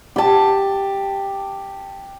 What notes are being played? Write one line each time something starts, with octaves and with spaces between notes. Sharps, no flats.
G4 A5